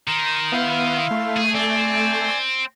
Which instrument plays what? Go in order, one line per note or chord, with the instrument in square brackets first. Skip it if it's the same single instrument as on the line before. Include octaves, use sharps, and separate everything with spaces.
[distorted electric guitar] D#3 [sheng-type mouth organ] A#5 C6
[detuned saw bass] B3 [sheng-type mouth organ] E4 F5 C6
[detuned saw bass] A3
[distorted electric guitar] G#4
[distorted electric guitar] C4 [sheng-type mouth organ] D5 G#5